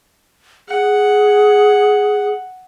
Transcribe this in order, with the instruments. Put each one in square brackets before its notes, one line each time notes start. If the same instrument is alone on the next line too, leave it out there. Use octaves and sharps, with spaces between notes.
[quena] G#4 [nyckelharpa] F#5